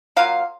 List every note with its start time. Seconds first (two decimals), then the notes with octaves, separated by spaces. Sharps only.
0.16 F#3 A#3 F4 F5